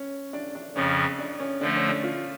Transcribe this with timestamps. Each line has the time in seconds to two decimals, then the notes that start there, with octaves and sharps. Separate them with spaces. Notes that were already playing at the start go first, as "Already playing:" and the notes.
Already playing: C#4
0.33 D4
0.55 D4
0.75 F2 C#3 F3 C#4
1.19 D4
1.40 C#4
1.61 D3 F3 A3 D4
1.75 C#4
1.89 D4
2.03 F4